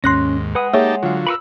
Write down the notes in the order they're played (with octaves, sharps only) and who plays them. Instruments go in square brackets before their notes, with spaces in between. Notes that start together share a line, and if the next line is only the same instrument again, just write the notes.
[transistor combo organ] D#2 G#2 [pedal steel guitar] C#4 [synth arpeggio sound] C6 F#6 A#6
[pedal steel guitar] G#3 F#5 D#6 [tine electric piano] B4
[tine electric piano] A#3 [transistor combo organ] D#4 G4 A5 [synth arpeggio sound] G#4 C#5 E5
[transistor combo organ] D3 F#3 [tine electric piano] F4 F5
[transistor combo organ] A#4 B4 [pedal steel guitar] B5 C#6 E6